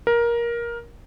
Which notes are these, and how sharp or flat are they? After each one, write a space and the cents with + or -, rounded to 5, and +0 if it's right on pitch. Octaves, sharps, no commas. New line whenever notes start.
A#4 +15